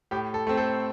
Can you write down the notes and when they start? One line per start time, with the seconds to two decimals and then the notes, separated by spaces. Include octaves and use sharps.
0.11 A2 G4
0.34 A4
0.47 A3 C4
0.57 A4 C5